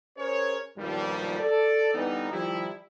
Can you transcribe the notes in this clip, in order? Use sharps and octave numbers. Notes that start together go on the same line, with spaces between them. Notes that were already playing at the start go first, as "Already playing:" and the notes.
C#4 G#4 A#4 C5 C#5
B1 G2 A#2 D#3 F3 G3
A4 D5
D3 E3 G3 B3 D4 D#4
D#3 F3 G3 E4